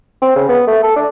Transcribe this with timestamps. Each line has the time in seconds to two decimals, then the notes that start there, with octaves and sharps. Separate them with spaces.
0.22 C4
0.36 C#3
0.49 B3
0.68 A3
0.84 A4
0.96 D4